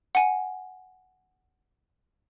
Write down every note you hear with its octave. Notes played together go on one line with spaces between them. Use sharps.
F#5 G#5